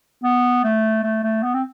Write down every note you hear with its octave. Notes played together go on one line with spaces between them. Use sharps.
B3
A3
A3
A3
B3
C4